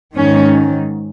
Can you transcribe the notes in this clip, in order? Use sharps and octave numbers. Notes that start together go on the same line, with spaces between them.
G#2 D#3 C#4